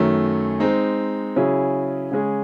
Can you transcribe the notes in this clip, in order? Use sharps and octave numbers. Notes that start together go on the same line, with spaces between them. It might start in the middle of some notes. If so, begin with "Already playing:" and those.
Already playing: F#2 D#3 F#3 A3 C#4
G#3 C4 D#4
C#3 F#3 C#4 E4 G#4
C#3 G#3 C#4 G#4